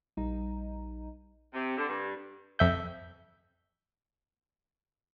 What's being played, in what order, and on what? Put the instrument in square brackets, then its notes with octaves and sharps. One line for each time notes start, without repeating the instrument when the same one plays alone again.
[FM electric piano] A#1 G3 D#4 D#5 A#5
[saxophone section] C3
D3
G2
[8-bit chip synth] F2 E5 G6